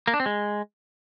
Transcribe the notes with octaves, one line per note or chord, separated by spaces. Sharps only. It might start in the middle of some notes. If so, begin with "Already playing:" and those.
A#3
D4
C4
G#3